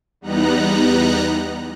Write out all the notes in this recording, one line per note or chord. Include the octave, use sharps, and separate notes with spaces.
E2 G3 B3 D#4 A#5 F#6